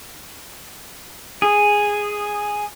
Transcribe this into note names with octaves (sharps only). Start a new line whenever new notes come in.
G#4